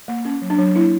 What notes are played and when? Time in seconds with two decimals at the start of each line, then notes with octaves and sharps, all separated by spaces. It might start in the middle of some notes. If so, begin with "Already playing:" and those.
0.08 A#3
0.25 C#4
0.42 F#3
0.50 D4
0.58 F#3
0.75 A#3 E4